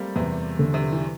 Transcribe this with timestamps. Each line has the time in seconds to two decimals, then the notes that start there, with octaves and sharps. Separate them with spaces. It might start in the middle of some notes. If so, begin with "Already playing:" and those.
Already playing: G3 A3 A#3 C4
0.16 E2 C3
0.59 D3
0.74 C3
0.92 E3